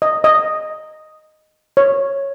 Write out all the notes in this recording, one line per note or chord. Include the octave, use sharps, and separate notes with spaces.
D#5
D#5
C#5